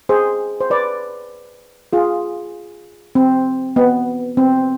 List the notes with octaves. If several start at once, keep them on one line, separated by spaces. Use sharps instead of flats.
G#4 C5
C5
B4 D5
F4 G#4
C4
B3
C4